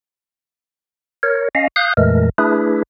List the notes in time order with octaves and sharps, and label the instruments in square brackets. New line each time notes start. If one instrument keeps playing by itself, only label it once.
[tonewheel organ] A#4 C#5
C#4 D#5 F5
F5 D#6 F#6 G6
F2 A#2 E3 G#3 A3 A#4
A3 D4 E4 G#4 B4